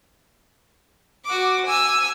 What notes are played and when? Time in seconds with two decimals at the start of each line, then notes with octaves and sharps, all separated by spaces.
1.25 F#4 D6
1.66 G#5 E6